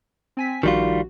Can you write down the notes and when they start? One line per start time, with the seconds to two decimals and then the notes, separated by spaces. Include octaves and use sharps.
0.37 C4 G#5 B6
0.63 A#1 D#3 G3 F4 F#4